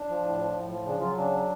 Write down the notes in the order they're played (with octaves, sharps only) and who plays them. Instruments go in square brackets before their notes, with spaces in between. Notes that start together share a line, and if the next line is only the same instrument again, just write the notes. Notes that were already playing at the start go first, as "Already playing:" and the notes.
Already playing: [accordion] D4
F3
A2
F3
A2
F3
C#3 D4
F#3 F4
C#3 D4
F#3